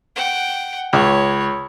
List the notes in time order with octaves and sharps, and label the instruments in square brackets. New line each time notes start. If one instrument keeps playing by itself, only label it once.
[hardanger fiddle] F#5 G5
[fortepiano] C#2 [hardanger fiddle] C#5